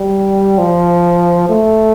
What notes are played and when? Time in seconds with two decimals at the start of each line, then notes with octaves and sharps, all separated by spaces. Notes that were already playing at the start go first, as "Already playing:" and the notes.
Already playing: G3
0.58 F3
1.49 A3